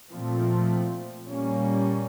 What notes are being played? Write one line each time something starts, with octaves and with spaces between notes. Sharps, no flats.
A#2 F3 A3 C4
A#2 G3 A#3 C#4